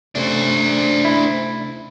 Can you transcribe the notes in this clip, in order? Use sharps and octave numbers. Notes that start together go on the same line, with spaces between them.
C3 A3 C#4 D4 C5
E4